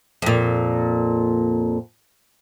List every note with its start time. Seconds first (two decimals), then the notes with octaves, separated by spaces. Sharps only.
0.22 F2 A#2